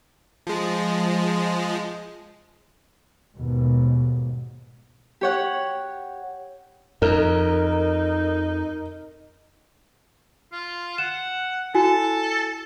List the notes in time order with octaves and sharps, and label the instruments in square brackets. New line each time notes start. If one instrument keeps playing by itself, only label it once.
[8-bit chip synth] F3 G#3
[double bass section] D#2 G#2 B2
[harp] G4 C#5 F#5
[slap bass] F2 [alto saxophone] D#4 [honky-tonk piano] A#4
[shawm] F4
[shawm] F#5 [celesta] E7
[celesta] E4 F#4 G#5 [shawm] A4